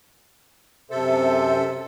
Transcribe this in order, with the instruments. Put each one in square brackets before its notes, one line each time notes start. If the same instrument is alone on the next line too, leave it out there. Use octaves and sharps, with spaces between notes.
[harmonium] F#2 C5 E5 [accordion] C3 A4